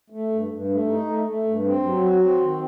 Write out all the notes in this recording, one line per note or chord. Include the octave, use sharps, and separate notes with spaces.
A3
G2
G2
A3
D#4
A3
A3
G2
C4
F#3
F#4
C4
D#3